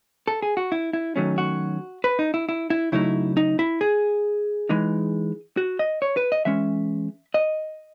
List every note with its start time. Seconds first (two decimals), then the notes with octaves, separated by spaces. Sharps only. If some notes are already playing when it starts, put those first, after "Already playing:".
0.28 A4
0.42 G#4
0.57 F#4
0.72 E4
0.93 E4
1.16 D#3 F#3 A3 C#4
1.38 F#4
2.04 B4
2.19 D#4
2.34 E4
2.49 E4
2.70 E4
2.92 C#3 F#3 A3 D#4 E4
3.37 D#4
3.59 E4
3.81 G#4
4.69 E3 G#3 D#4
5.57 F#4
5.79 D#5
6.02 C#5
6.17 B4
6.32 D#5
6.45 E3 G#3 C#4 E5
7.34 D#5